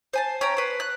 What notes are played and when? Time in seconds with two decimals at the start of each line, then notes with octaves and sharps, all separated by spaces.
0.13 C5 G#5 A5
0.41 C#4 G5 A#5
0.57 B4 C5
0.80 F#6